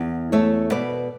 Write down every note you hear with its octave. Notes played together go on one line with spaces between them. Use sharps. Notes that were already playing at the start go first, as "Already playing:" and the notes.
Already playing: E2
A3 C#5 E5
B2 B4 D5